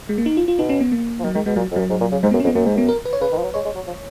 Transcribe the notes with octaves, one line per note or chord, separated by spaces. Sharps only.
G#3
A#3
D#4
F4
F4
B2 D#4
C#4
B3
A#3
F3
D#3 F#3
D#3 G#3
B2 G#3
A#2 F#3
F2
F#2 F#3
G#2
A#2
C#3
G#2 G#3
F#2 B3
C#4
F2
B3
F#2 A#3
G#2 G#3
F#2 B3
A#4
B4
C#5
C#3 B4
D#3
F3
F#3
G#3 C#5
G#3
F#3
F3